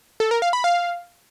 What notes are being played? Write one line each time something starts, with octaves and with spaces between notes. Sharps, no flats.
A4
A#4
F5
B5
F5